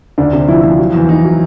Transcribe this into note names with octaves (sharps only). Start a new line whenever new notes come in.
D2 D4
C3
F3 E4
F3
F#3
E2
E2 D#4
F#3